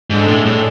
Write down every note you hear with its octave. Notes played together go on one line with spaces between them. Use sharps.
G#2 G#3 D4 A4
A2
A2